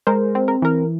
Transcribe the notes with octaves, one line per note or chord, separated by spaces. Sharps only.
G#3 A#4 C5
C4
A#4
E3 A#4